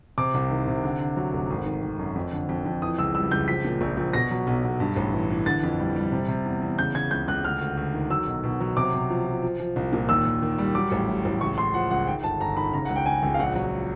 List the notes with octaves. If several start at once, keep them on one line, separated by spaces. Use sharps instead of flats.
C3 D6
C2
D#3
C3
D3
D3
F#3
F1
G#1
D#3
D#3
F#2
F2
D3
F2
F2
E3 D#6
C#2 E6
G3 E6
C#2 G6
F3 B6
A#2
A#1
A#1
B2 A#6
F#3
B1
B1
G2
A1
E3
E3
D3 A6
F2
G3
G3
C3
C3
E2
E2
C#3 G6
C#3 G#6
C#2 G6
C#2 F#6
D2 F6
D2
D2
D#3
F#3 E6
B1
B2
F#3
C3 D6
C3
F3
F3
F3
F3
C2
A#2
D#2 E6
D#2
D#3
G3
F#3 D6
A1
A2
A1
C#2 C#6
C#2 C6
F3 F#5
C#2 F#5
D#3 G5
G1 A5
G1 A#5
D#3 B5
C#3 A#5
C#2 F#5
G5
C#3 G#5
C#2
F5
A#1 F#5
F#3